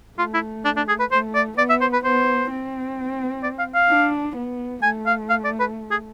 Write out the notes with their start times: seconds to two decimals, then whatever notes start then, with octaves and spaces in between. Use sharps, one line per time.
0.18 A3 F4
0.34 E4
0.65 D4
0.76 D4
0.88 G#4
0.99 B4
1.11 A3 C5
1.35 D5
1.58 B3 D5
1.70 E5
1.81 C5
1.93 B4
2.04 B3 C5
2.50 C4
3.43 D5
3.59 F5
3.74 F5
3.90 D4
4.36 B3
4.82 A3 G#5
5.06 F5
5.30 F5
5.45 D5
5.60 B4
5.91 G#4